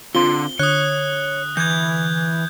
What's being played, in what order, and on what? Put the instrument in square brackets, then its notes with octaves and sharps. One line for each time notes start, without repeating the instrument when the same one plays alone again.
[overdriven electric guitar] D3 C6 [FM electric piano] C4 F4 [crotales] G7
[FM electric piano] D3 [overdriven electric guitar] C#5 [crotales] D#6 F#6
[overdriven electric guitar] E3 [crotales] G6 G#6